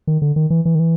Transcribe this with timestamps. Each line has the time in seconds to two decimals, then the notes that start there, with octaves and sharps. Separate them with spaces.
0.07 D#3
0.22 D3
0.36 D#3
0.50 E3
0.65 E3
0.75 D#3
0.79 E3